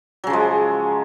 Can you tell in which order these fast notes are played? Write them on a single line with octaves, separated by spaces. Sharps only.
F#3 C#3 F3 G#3